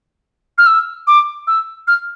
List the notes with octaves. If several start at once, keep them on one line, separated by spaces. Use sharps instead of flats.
F6
E6
D6
E6
F6